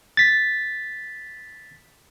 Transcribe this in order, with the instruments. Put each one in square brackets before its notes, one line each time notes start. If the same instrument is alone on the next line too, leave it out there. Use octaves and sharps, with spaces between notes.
[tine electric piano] A6 B6